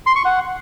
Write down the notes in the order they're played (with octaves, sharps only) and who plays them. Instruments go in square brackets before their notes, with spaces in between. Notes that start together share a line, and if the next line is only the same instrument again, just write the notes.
[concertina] C6
C#6
F#5